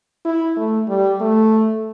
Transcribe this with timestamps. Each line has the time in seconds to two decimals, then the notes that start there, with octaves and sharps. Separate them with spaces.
0.25 E4
0.57 A3
0.88 G3
1.21 A3